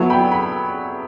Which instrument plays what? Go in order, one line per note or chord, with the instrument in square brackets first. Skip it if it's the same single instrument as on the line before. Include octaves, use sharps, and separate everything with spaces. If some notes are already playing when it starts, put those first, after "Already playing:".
Already playing: [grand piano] F#3 B3 E4 A4
[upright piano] G5 B5
B5